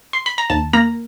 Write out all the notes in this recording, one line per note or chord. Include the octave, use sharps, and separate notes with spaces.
C6
B5
A#5
D#2 A5
A#3 A#5